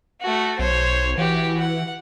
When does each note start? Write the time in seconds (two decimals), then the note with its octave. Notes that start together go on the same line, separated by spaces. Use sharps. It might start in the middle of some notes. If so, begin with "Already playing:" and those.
0.22 A3 F#4
0.59 B1 C5 C#5
1.18 E3 F#4 G4
1.60 F#5